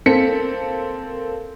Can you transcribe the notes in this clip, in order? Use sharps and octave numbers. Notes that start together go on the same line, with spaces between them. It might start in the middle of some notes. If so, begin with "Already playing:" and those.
A#3 C4 A4 B6 C#7